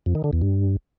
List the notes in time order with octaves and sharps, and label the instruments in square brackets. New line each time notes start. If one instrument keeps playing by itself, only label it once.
[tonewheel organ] F2
D#3
D3
E2
G2